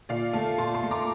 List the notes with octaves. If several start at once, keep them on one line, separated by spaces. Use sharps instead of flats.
A#2 D5 F5
A3 F5 A5
A#2 A5 C6
A5 C6
A3
A#5 D6